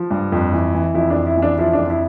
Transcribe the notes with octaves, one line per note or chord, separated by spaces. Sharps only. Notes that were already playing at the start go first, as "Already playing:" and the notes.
Already playing: F3
G2
F2
E3
E3
F2 E4
D4
F2
E4
E3
D4
F3 E4
D4
F2
E4